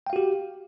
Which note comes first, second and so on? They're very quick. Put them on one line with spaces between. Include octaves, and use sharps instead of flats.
G5 F5 F#4 G4